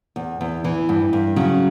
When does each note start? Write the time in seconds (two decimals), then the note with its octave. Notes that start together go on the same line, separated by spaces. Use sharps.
0.16 E2
0.41 E2
0.64 E3
0.89 G2
1.13 G2
1.36 C#3 F#3